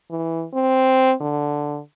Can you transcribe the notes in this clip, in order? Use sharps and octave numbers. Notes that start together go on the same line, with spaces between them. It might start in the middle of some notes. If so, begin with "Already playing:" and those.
E3
C4
D3